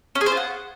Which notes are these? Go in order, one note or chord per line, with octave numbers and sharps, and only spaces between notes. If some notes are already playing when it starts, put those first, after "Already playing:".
C#4
G#4
C5
F4
F#5